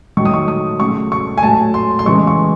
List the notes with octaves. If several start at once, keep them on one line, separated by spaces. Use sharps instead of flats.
D#3 F#3 A3 C#6
D#6
C#6
D#6
C#3 F#3 A3 C#6
C#6
G#5
A2 F#3 A3 A5
C6
C6
C#3 E3 G#3 C#6
C#6